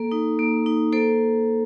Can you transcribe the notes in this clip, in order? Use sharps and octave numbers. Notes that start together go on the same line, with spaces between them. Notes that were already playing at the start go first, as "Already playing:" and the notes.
Already playing: A#3 A4
D#4
A#3
D#4
A#3 A4 C5